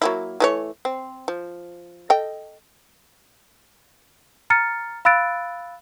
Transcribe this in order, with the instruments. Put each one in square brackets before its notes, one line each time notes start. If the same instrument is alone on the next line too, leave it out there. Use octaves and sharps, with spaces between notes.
[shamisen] F#3 A#3 E4
E3 A3 C#5
C4
F3
A4 D#5 G5
[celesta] A#5 F6 A6 C#7
F5 B5 E6 F#6 A6 D7